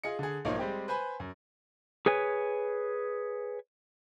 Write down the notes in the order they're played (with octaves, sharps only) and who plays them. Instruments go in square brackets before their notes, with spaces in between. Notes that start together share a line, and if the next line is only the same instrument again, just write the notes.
[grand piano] F4 G#4 D#5 C#7
D3 G#4
B1 G#2 F3 A#3 D#4 C#5
G3 G#3 C4 G4
B4 C5 G#5 B5
F#2
[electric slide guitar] G#4 B4 C#5 G#5